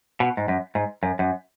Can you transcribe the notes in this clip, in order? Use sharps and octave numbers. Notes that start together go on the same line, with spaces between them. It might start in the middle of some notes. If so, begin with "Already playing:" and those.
B2
G#2
F#2
G#2
F#2
F#2